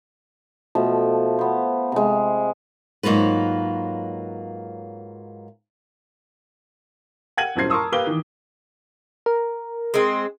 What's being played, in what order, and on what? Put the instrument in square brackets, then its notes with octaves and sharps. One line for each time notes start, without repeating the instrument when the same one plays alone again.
[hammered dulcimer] B2 F3 A3
B3 C5
C3 G#3
[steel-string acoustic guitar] G#2 F#3 A#3 F4 B4
[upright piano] F#5 G5 G#6 D#7 F#7
D#1 F#2 E4 C5 G#6 C7
A#4 A5 C6 C#6 D#6 E6
A#3 G4 B4 F5 D6 G7
D#3 E3
[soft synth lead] A#4
[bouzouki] G#3 C4